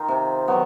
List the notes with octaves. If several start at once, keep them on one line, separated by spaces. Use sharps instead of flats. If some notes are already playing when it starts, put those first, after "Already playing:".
Already playing: D#3 D#4 F4
C3
D#3 F#3 B3